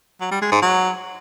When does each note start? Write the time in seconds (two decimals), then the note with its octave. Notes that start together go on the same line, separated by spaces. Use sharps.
0.21 F#3
0.31 G3
0.41 G#3
0.52 G#2
0.62 F#3